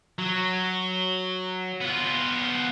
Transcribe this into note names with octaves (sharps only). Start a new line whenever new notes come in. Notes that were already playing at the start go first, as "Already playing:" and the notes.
F#3
B3 F4